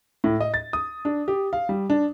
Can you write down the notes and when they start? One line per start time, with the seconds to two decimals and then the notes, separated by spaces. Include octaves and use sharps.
0.24 A2
0.40 D#5
0.54 A6
0.73 D#6
1.05 D4
1.28 G4
1.53 F5
1.69 G3
1.90 D4